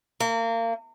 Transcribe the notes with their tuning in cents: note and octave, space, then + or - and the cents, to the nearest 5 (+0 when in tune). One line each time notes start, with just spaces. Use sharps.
A#3 -30